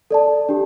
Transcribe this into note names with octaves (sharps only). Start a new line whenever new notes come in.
A4 D5 A5
D4 G4